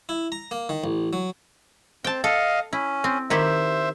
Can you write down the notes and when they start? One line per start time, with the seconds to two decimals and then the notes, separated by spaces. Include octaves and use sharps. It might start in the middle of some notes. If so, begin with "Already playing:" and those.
0.09 E4
0.32 A#5
0.51 A#3
0.69 D#3
0.84 A1
1.13 F#3
2.04 C4 G5 A5
2.24 A4 D#5 F5
2.73 C#4 E4
3.04 C4
3.30 D#3 E4 G4 C5 E5